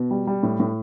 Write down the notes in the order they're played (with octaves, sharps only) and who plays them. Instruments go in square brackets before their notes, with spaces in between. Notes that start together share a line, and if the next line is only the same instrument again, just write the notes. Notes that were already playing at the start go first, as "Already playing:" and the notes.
Already playing: [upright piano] B2
G3
G3
A2
A2